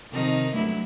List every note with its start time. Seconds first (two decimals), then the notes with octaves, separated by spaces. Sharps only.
0.12 C3 D#3 F3 D#4
0.54 G2 F#3 A3 E4